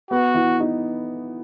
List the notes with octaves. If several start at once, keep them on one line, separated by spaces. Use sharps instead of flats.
B3 F#4
E3
D#4